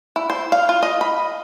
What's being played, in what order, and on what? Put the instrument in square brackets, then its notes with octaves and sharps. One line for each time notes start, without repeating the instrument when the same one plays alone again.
[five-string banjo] E4
C5
F5
F4
D#5
B5